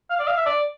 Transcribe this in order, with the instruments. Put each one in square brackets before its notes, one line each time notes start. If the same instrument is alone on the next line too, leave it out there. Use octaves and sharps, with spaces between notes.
[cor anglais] F5
D5
F5
E5
D5